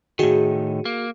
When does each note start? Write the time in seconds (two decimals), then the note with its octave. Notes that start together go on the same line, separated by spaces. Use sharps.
0.19 A2 D#3 F#4 G#4
0.85 A#3